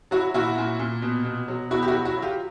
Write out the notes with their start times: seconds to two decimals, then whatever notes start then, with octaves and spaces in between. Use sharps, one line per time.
0.11 F#3 E4 F#4
0.34 A#2 E4 F#4
0.58 A#2
0.79 A#2
1.02 B2
1.25 B2
1.48 F#3
1.71 B2 E4 F#4
1.82 G4
1.88 E4 F#4
1.93 F#3
2.05 E4 F#4
2.17 F#3
2.22 F4 G4